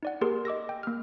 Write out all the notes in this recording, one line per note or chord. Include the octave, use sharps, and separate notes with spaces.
D#4 D5 F#5
A#3 G4 G#4 A#4 C6
D#5 D6 E6 A#6
G5
A#3 F6